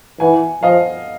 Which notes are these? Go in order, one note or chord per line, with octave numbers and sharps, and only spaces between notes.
E3 F#5 G#5
F3 D#5 F5